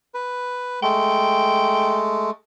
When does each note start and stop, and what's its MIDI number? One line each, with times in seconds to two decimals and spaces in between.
0.14 0.80 71
0.83 2.31 56
0.83 2.31 57
0.83 1.99 79